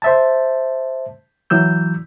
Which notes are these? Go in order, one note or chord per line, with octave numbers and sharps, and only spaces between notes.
C5 E5 A5
E3 F#3 E6 G6